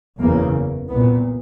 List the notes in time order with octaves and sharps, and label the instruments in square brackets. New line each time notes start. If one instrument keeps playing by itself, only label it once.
[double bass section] F#1 E2 C#3 A#3
C2 A#2 B3